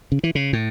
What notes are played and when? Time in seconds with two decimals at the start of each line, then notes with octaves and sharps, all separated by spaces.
0.12 C#3
0.23 E3
0.35 C#3
0.53 A2